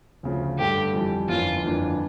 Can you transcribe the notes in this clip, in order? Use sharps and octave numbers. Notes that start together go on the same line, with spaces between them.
D2 C#3 F3
G2 D3 A3 D4 G4
F2 E3 G3
G1 F2 E3 A#3 C#4 F4
G1 F2 E3 A#3 D4